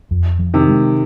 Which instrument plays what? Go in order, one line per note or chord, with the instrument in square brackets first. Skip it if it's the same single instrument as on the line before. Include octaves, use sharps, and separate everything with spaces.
[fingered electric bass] F2
F3
[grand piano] C3 D#3
[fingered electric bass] G#3